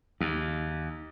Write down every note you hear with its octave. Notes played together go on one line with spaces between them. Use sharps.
D#2